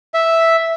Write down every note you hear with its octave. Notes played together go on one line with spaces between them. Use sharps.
E5